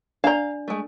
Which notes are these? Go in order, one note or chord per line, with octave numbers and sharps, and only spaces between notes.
D4 D5 F5 A#5
G#3 A3